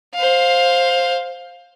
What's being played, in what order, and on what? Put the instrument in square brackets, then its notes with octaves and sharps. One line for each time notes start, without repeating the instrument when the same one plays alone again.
[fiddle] C5 F5